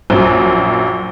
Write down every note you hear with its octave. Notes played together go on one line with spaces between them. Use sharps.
A#1 F#2